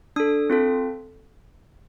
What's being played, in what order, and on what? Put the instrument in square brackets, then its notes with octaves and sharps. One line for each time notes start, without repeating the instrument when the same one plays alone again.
[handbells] D4 A4 D#6
C4 F4 A4